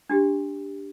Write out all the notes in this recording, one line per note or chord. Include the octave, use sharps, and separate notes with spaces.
D4 F#4 G4